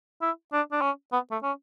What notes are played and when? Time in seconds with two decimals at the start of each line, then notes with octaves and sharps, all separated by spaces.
0.22 E4
0.53 D4
0.72 D4
0.81 C#4
1.13 B3
1.31 A3
1.43 C#4